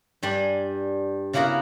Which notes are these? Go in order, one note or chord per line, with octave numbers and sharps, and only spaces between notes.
G2 G3 D4 G#5
C#3 A#3 B3 E4 F#4 A#4